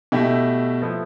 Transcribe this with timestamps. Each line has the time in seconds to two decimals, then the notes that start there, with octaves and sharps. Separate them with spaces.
0.12 B2 A3 E4 G4
0.82 F3 B3 E4 A4